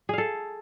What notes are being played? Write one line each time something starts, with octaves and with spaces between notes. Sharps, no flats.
G#4 A4 F5